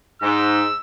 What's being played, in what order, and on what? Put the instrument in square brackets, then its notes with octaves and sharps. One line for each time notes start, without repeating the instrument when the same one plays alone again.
[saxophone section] G#2 [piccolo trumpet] E6